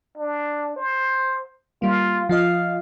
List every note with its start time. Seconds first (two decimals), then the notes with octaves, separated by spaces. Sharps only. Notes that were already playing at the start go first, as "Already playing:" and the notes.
0.18 D4
0.76 C5
1.82 G3 A#3 F4
2.29 F3 F4 D#5 F5